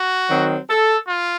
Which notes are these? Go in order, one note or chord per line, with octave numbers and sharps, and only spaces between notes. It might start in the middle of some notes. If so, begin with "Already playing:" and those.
Already playing: F#4
D#3 F#3 C4
A4
F4